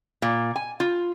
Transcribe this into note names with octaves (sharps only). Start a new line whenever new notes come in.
A#2
G#5
F4